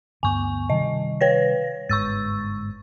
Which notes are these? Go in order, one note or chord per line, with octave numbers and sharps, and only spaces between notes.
D2 G2 B3 G#5 C#6
C3 D#3 G3 D#5
B4 C#5 A#6
G1 G#2 C#6 E6 A6